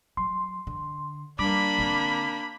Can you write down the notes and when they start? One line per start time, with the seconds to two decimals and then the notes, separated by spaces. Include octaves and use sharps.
0.17 F#3 C6
0.67 D3
1.39 G3 A#3 D4 B5 D6
1.78 D3 C4